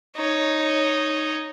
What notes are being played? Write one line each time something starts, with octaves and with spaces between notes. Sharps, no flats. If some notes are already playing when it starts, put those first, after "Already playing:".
D#4 C#5